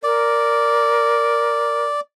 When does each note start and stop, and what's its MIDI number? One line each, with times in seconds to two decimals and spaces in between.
0.03 1.85 70
0.03 2.00 74